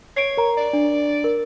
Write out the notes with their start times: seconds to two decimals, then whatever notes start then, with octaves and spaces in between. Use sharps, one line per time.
0.17 C#5 C7 D7
0.37 A#4 A#5
0.58 D5
0.73 D4
1.24 A#4